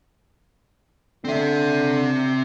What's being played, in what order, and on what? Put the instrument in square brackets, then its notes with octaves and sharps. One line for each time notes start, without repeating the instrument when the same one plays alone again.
[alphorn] D3 [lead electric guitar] C4 E5